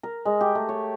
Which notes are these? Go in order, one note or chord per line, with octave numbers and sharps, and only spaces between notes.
A#4
G#3
G4
A3
C#5